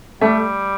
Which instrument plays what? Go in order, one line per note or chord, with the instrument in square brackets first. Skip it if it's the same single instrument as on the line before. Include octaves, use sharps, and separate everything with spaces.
[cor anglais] G3 [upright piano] A3